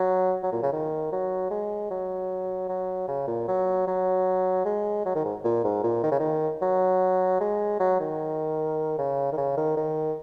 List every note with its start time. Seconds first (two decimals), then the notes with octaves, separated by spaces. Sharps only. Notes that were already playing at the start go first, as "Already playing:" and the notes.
Already playing: F#3
0.43 F#3
0.52 A#2
0.63 C#3
0.72 D#3
1.12 F#3
1.51 G#3
1.90 F#3
2.69 F#3
3.08 C#3
3.28 A#2
3.48 F#3
3.87 F#3
4.65 G#3
5.05 F#3
5.15 D#3
5.24 G#2
5.44 A#2
5.64 G#2
5.83 A#2
6.03 D#3
6.11 C#3
6.20 D#3
6.62 F#3
7.41 G#3
7.80 F#3
8.00 D#3
8.98 C#3
9.32 D#3
9.37 C#3
9.57 D#3
9.77 D#3